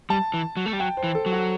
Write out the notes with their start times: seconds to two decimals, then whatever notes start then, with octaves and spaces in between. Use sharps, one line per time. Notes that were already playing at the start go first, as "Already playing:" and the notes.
0.10 G3 A5
0.34 E3
0.57 F#3
0.66 A3
0.73 G3
0.80 F#3 G5
0.97 C5
1.03 E3
1.15 A4
1.26 F#3
1.32 F#4